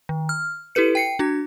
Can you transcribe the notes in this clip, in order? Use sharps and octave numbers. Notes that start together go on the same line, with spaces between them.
D#3
F6
E4 G4 A4 B4 C#7
G5 C7 C#7
D4 F#4 G#6